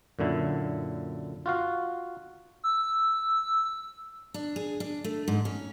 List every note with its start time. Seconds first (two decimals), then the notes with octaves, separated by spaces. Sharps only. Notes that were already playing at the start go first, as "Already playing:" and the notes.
0.19 F#2 A#2 D3 E4
1.46 F4 F#4 F5
2.64 E6
4.34 D4
4.56 G#4
4.80 D4
5.04 A3
5.28 G#2
5.45 C#4